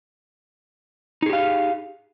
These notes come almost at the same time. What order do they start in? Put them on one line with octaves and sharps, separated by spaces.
D#4 G#4 G4 F5